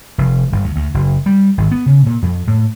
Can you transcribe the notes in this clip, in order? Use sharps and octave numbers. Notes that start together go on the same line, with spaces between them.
F1
G1
D2
D2
F#1
G3
G#1
B3
C#3
A#2
F2
A2